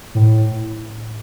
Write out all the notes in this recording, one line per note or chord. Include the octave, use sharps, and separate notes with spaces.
A2